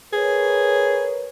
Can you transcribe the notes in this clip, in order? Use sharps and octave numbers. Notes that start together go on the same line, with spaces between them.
G#4 A#4 B4 C#5